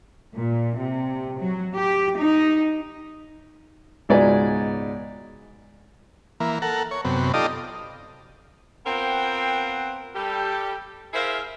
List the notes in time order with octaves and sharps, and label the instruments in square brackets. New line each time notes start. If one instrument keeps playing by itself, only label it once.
[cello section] A#2
C3
F#3
G4
D#4
[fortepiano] C#2 G#2 B2 D5 G#5
[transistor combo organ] E3 A#3
A4 A#4 F#5
C#5
F#2 C3 B3
D#4 F4 G4 A4 D5 D#5
[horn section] B3 C4 F4 A#4 F#5 G5
G3 G4 A4
E4 G#4 A#4 C5 E5 F5